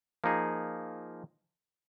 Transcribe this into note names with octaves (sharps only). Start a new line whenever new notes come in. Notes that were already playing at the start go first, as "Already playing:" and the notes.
F3 A#3 D#4 G#4